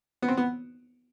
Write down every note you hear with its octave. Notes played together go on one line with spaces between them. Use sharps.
B3
C4
B3